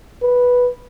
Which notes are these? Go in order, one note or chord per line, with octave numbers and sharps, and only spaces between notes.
B4